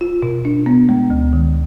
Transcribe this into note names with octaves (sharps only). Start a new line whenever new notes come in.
F4
B2
D4
B3
G#3
D2
D#3